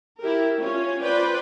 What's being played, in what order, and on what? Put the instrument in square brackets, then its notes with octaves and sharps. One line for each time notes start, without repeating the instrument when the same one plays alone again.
[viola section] E4 G4 A#4
C#4 F4 C#5
F4 B4 C5 D5 G5